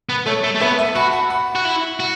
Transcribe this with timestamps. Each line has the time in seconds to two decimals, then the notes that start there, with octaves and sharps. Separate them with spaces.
0.09 B3
0.26 A3 A4 C#5
0.44 A3
0.55 A3
0.60 B3 B4 E5
0.78 E5 A5
0.95 F#4 F#5 B5
1.13 F#5 B5
1.30 F#5 B5
1.56 F#4
1.65 E4
2.00 F#4